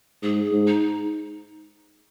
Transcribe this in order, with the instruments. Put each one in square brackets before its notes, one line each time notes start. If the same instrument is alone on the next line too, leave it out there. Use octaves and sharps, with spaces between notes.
[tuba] G#2 [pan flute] G#4
[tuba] G#2
[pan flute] D#4